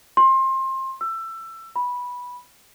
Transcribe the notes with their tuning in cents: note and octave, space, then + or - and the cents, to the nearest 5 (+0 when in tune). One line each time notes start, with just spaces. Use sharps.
C6 +25
E6 +20
B5 -10